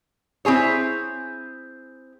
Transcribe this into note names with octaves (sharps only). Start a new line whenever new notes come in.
C4 E4 G#4 C#5